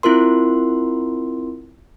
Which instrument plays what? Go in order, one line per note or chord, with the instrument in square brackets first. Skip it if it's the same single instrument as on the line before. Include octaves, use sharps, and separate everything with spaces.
[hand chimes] C4 E4 F4 A#4 C6